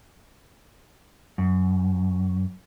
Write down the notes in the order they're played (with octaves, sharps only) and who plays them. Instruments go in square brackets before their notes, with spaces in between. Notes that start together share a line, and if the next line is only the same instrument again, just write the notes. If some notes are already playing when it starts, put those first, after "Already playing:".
[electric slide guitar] F#2